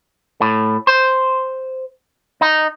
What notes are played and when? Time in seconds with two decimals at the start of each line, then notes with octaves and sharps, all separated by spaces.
0.41 A2
0.87 C5
2.41 D#4